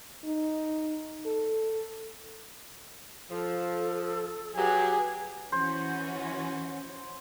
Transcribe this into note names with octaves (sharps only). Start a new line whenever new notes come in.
D#4
A4
F3 A4
F#3 G4 G#4 B4
E3 C#4 F#4 C5